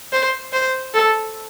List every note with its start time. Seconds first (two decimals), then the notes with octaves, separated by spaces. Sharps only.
0.13 C5
0.53 C5
0.94 A4